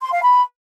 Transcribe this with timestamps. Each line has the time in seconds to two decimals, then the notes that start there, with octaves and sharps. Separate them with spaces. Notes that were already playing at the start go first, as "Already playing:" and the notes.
0.01 C6
0.12 F5
0.22 B5